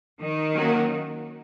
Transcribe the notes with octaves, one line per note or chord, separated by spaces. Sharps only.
D#3
F#3 A#3 C#4 F#4 A#4